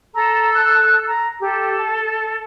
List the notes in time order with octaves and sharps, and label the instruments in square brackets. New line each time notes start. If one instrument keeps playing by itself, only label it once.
[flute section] A4 E6 [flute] A#5
[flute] F#6
A#5
[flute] G4 [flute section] A4
[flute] A5